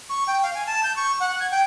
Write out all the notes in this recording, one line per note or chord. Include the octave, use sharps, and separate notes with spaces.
C#6
G5
F5
G#5
A5
G6
C#6
F#5
G#6
G5